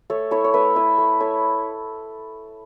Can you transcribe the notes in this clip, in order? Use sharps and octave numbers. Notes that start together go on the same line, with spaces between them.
A3 A4 C#5
E4 A4 C#5
C#5
A3 B4 E5
E4 B4 E5
A3
E4 A4 C#5